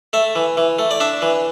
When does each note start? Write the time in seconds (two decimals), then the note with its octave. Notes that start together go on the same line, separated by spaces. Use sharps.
0.13 A3 E5
0.36 E3
0.57 E3
0.79 A3
0.91 D5
1.00 D4 E5
1.22 E3